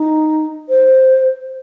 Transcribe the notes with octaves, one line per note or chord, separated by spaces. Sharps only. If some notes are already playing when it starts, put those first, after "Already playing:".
Already playing: D#4
C5